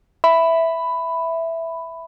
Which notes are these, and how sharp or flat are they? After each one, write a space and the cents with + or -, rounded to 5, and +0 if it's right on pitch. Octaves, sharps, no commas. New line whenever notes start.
E5 +0 B5 +10